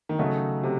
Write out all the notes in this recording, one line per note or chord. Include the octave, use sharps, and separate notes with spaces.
D#3
C#3 F#3 A3 D#4 F#4 A4
C3